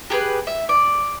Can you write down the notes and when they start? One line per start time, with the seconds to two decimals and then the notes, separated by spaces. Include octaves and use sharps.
0.10 G4 G#4 B4
0.47 E5
0.69 D5